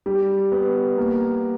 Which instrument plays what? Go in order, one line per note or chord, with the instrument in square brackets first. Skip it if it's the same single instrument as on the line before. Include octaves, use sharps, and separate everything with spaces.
[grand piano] G3
B3
A#3